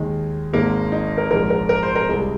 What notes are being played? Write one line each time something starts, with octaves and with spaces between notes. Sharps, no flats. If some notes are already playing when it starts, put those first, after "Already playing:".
Already playing: D#2 D#3 G#3
G#1 G#2 G#3 A#3
D#4
A#4
A#1 G#2 G#3 A#4
A#4
A#4
C5
A#4
C2 C3 G#3